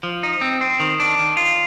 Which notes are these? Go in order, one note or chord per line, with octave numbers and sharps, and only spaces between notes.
F3
D#4
C4
C4
D#3
D4
D#3
F4